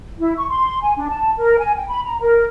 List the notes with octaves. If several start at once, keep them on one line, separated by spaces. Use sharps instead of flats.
E4
C#6
C6
G#5
D4
A5
A#4
G#5
G5
B5
A#5
A#4